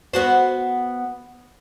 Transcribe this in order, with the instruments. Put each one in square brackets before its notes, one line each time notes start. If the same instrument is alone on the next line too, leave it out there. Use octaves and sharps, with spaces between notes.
[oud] B3 F#4 C5